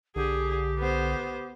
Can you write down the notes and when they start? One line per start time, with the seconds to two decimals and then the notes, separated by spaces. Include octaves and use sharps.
0.16 B1 D3 G4 G#4
0.78 B3 C5